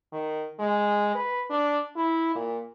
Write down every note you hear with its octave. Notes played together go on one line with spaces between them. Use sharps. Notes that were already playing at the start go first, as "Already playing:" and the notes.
D#3
G#3
B4
D4
E4
A#2